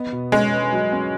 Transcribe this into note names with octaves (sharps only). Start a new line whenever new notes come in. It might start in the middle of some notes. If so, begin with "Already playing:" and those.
Already playing: B3 D#5
B2
G#3 C#4
B4
F#3
C#4